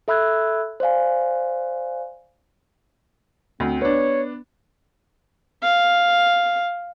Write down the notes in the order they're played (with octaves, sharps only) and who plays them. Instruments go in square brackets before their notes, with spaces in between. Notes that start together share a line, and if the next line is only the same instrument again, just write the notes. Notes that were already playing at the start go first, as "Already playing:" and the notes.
[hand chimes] A4 E5 B5 E6 F#6 G#6
C5 D5 F5 G#5
[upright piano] D2 [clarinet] C4
[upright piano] B3 D4 [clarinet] C#5
[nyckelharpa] F5